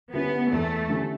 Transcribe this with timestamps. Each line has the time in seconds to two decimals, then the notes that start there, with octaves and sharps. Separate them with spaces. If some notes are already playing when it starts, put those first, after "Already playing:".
0.12 D3 G3 B3 C#4 E4
0.51 E2 A3
0.90 D3 G3 C#4 E4